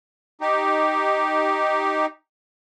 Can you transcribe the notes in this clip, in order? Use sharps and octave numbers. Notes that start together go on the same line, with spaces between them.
D#4 G4